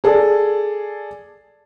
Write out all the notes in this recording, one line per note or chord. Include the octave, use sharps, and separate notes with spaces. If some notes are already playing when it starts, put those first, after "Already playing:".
G#4 A4 D5